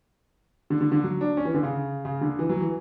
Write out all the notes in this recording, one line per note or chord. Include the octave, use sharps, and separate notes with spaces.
D3
D3
D3
F#3
D4
C#4
E3
D3
C#3
C#3
D3
E3
F#3
E3